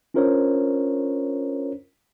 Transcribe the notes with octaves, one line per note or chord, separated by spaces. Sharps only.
C#4 D4 F4 A#4 C5 C#5